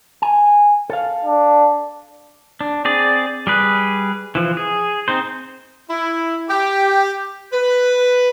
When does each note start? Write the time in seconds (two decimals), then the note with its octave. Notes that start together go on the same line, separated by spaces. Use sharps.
0.22 G#5
0.90 A4 F5
1.25 D4
2.61 D4
2.85 C4 G#4 D5
3.47 G3 G#4 B4
4.35 E3 F3
4.57 G#4
5.08 C4 D#4 C5
5.90 E4
6.49 G4
7.52 B4